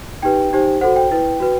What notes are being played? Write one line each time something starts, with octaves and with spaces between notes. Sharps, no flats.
D#4 G4 B4 G5
D#4 G4 C5
F#4 A4 C5 F#5
G5
E4 B4
F#4 B4